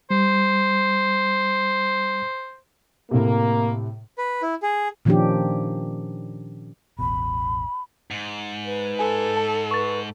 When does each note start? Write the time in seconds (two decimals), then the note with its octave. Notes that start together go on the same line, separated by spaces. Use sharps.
0.10 G3 C5
3.11 A2 C3 A#3
4.18 B4
4.42 E4
4.62 G#4
5.05 A#2 D#3 F3 C#4 D4 G4
6.99 E1 A1 B2 B5
8.11 G#2
8.65 B4
8.99 A4 G#5
9.37 A5
9.71 B4 C#6 A6